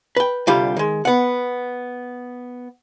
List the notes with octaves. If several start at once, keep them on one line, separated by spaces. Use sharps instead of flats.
B4 G5
C2 D3 G3 F4 G4
D#3 G#3
B3 F#5